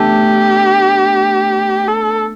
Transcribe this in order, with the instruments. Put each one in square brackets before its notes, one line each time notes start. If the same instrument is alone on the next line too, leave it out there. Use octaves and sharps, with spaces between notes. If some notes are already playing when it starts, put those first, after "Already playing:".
Already playing: [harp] A3 B3 D4 [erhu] G4
[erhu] A4